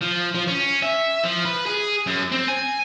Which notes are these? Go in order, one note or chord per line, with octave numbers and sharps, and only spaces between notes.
F3
F3
C#4
E5
F3
B4
G#4
F#2
C4
G#5